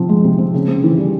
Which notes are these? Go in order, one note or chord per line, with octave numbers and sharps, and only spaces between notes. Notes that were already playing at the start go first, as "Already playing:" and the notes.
Already playing: C3 F3 C4
G#3
C3
C4
C#3
C4
E3
G3